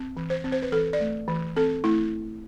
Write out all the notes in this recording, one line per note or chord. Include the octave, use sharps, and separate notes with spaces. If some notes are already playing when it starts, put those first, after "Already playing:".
Already playing: C4
E3
C5
C4
C5
B4
E3 A4
D5
A3
E3
C4 A4
A3 E4